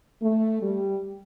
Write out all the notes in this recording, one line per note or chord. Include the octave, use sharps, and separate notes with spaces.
A3
G3